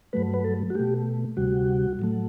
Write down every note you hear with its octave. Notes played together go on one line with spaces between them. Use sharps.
G2 F#3 A3 B4
B4
A4
F#4
B2 A3 G4
D2 C3 G3 F#4
A2 F#3 A3